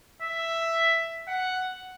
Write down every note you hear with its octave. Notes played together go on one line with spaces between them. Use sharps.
E5
F#5